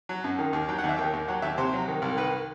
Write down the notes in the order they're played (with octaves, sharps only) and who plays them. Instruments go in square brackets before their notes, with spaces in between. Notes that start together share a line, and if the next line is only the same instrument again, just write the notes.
[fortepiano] F#3
F#2
D#3
D#2
F#3 G5
F#5
D#2
E5
D#3 G5
D#2
F#3 F#5
D#2 E5
C3 C5
F#3
D#3
C2
D#3 B4